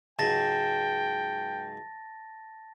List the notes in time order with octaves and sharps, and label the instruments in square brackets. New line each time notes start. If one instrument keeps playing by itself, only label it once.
[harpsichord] C#2 G#2 F#3 [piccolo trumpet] G5 [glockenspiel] A5 A6 A#6